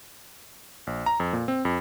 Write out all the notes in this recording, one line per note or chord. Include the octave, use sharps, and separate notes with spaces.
A#1
A#5
F2
A#2
C4
F2